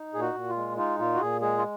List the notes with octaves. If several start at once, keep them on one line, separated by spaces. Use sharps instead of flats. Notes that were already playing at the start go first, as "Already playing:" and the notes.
Already playing: D#4
A#2 G#4
F#4
A#2
F4
G#3
D#4 F4
A#2 F4
F#4
A#2 G#4
G#3 G#4
F4